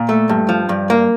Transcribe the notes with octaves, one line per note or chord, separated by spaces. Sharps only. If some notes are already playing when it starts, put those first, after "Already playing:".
Already playing: A#2
A3
G2
F3
G2
A#3